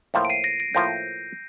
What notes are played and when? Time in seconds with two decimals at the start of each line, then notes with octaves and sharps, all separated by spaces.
0.14 A2 F3 A#3 F4 C5
0.25 D7
0.30 C7 D#7
0.44 A#6 D7
0.60 A#6 D7
0.75 A2 F3 A#3 F4 C5 G6 A#6